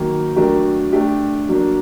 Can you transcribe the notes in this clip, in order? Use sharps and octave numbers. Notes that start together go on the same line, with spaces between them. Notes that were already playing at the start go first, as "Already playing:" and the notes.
Already playing: D#3 F#3 A#3
F#3 A3 D4 G4 A#4
A3 D4 G4
F#3 A#3 D4